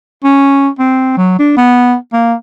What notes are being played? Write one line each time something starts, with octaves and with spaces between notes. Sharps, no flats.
C#4
C4
F#3
D4
B3
A#3